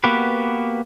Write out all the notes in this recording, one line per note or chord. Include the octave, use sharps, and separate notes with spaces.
A#3 B3 F#4 G4 B4